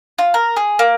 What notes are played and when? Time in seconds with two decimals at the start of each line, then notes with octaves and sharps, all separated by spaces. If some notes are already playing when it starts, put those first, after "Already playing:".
0.18 F4
0.34 A#4
0.56 G#4
0.79 A#3